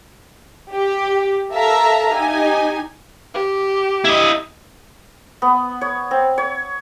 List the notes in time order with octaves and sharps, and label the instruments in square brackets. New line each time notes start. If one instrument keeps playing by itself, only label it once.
[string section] G4
A4 A#4 E5 F5 A5 A#5
D#4 G4 G#5
[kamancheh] G4
[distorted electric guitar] E4 D#5
[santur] B3
C#5
C4
C#5